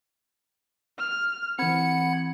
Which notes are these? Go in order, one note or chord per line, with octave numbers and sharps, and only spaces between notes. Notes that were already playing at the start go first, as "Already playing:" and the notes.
F6
E3 C4 F#5 B5 G#6 C#7